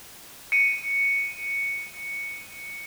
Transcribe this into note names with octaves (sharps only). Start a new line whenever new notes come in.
C#7 D#7